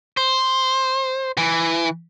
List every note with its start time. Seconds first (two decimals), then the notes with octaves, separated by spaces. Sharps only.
0.17 C5
1.38 E3